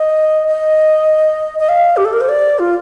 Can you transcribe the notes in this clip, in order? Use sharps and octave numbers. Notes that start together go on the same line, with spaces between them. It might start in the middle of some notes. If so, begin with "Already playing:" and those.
Already playing: D#5
D#5
D#5
F5
G4
A4
A#4
C5
D5
F4